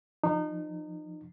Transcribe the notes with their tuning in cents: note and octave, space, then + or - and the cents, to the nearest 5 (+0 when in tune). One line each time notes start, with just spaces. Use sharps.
F3 +0 D#4 -30